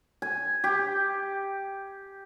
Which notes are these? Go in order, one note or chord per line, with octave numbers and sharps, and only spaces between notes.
G#5
G4